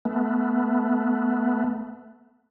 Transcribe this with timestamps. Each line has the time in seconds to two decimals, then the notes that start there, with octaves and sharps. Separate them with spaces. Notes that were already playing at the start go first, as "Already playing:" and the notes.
0.05 A3 B3